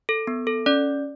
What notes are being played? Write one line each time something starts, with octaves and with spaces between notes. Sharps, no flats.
A4
B3
A4
C#4 D5